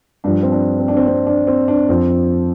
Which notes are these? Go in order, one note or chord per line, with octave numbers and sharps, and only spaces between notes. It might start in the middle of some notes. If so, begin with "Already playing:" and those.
G2 F3 D4
C4
D4
C4
D4
C4
C4
D4
C4
D4
F2 F3 C4